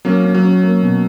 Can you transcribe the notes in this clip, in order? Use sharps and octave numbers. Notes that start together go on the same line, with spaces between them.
F#3 A#3 C#4
C#4
F#3
C#4
A#3
B2